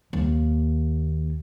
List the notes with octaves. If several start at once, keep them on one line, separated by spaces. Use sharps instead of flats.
D#2 A#3